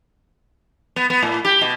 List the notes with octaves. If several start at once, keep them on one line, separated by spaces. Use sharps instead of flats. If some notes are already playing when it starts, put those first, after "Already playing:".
B3
B3
A2
G4
B2